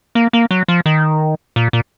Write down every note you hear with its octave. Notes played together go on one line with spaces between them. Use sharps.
A#3
A#3
F#3
F3
D#3
A#2
A#2